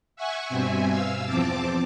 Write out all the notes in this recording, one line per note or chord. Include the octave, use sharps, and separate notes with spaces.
E5 F#5 G#5 C#6
G2 B2 C4 E5 G#5
F5 E6
E2 F3 C4 A5 D6